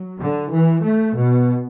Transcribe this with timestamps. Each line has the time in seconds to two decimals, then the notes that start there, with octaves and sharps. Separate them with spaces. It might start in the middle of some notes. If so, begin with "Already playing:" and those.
Already playing: F#3
0.20 D3
0.51 E3
0.84 A3
1.15 B2